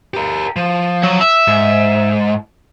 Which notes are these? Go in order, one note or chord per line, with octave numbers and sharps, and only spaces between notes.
G4 A#4
F3
F#3
E5
G#2